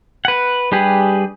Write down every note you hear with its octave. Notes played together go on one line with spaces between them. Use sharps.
B4 F#5
G3 D4 G4 G#4 B4